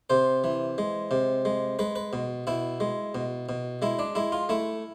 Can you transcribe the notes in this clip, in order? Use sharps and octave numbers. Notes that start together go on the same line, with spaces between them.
C3 C5
E3
G#3
C3
G#3
G#3 B4
B4
B2
B2 E4
G#3
B2
B2
G#3 E4
D4
G#3 E4
F4
A3 E4